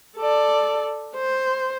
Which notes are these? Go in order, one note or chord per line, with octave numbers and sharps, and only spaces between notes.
A4 D5
C5